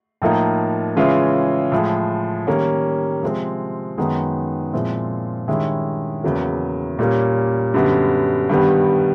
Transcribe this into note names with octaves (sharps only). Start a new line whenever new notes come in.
A2 F3 A#3 D#4
C#3 E3 G#3 C#4 F4
A2 F3 G#3
D#3 G3 A#3 C#4
C3 F3 G#3 C4
F#2 D#3 G#3 B3 D#4
A#2 F3 G#3 C4 E4
G2 D#3 G#3 C#4 E4
E2 C#3 F#3 A#3
A#2 G3 A#3 C#4
F#2 D3 G3 B3
G2 D#3 G3 B3